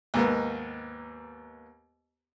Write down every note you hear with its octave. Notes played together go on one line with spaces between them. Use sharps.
D#2 G#2 A#3 B3